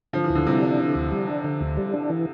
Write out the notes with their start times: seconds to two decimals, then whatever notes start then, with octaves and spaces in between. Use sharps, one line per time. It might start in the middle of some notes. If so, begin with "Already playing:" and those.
0.13 D3 F3
0.24 E3
0.30 D2
0.35 D3
0.46 C3 E3 G3
0.62 D4
0.79 D3
0.95 D2
1.11 G3
1.27 D4
1.44 D3
1.61 D2
1.77 G3
1.93 D4
2.10 E3